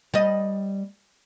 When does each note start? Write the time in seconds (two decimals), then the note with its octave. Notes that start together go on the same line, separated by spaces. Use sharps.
0.14 G3 D#5